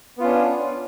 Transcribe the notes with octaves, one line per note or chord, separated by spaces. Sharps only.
B3 C#4 D4 F4